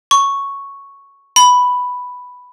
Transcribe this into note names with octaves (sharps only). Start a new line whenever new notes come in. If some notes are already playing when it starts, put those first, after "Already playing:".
C#6
B5